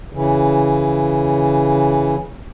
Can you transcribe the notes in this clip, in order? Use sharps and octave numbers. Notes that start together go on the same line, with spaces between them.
C#3 E3